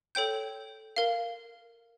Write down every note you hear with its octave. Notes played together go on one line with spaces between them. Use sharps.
A4 C#5 G5 G6
A#4 F5